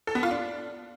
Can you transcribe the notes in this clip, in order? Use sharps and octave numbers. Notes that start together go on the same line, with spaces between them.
A4
B3
F4
D4